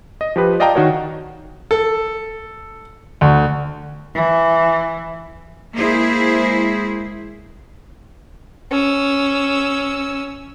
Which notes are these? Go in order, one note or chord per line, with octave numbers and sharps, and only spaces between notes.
D#5
F3 G4 B4
D5 D#5 F5 G5 A5 A#5
D#3 F#4 A#4 C#5
A4
D2
E3
G#3 A#3 E4 G#4 C5
C#4 E6